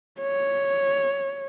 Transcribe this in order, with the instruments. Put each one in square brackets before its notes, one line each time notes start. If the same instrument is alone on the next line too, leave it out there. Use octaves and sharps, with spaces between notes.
[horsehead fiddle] C#5